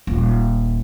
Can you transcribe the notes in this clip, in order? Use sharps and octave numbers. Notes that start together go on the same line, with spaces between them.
D#1 A#2